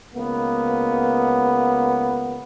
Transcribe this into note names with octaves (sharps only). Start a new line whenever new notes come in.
C#2 A#3 B3